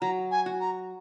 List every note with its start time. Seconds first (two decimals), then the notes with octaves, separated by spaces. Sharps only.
0.01 F#3 A#5
0.31 G#5
0.46 F#4
0.60 A#5